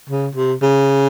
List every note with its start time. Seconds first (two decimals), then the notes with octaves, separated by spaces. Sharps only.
0.10 C#3
0.35 C3
0.62 C#3